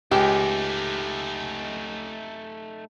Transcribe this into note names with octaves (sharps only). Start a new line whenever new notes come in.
C#2 A3 D#4 G4